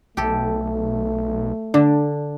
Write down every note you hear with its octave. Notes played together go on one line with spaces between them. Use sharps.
B1 A3 G4 A4
D3 D4